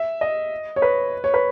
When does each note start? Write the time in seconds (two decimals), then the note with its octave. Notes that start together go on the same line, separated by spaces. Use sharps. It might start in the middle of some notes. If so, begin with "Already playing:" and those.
Already playing: E5
0.21 D#5
0.76 C#5
0.82 B4
1.24 C#5
1.34 B4